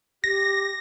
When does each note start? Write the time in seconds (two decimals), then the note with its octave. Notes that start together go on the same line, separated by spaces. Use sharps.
0.24 G4 A#6